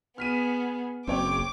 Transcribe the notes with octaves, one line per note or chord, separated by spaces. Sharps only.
B3 G#4 F6 B6 D#7
F#1 C4 C#5 G5 D6